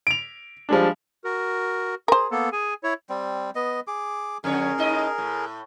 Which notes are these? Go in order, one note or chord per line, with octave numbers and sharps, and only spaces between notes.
D7 F7
F3 G3 G#3 D4
F#4 A#4
G#4 A#4 C5
A#3 B3 A4
G#4 G#5
E4 C#5
G3 C4
B3 D#5
G#4 D6
F2 D3 G#4 A#4 C#5
A2 D#4 D#5
A2